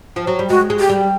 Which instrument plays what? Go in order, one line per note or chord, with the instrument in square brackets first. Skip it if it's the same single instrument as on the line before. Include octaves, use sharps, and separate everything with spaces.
[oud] F3
F#3
G3
[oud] G#3 [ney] F#4
[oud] G#3
[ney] G4
[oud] G3